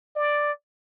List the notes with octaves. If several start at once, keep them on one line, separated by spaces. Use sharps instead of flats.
D5